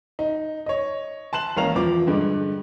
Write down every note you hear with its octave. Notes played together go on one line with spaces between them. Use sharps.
D#4
C#5 D#5
A5 C6 F#6 E7 F#7
A1 A#3 C#4 F5 A#5 F7
E2 F3 D6
G2 D3 G#3